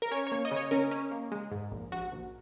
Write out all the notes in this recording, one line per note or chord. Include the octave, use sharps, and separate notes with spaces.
A#4
C#4 C#5
C#5
A#3
D#5
C#3
C#5
C#4 A#4
C#4
A#3
G#3
G#2
A#1
A#1 F#4
A#1